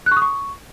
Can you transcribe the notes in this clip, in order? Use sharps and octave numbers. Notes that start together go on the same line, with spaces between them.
F#6
C#6
D#6
C#6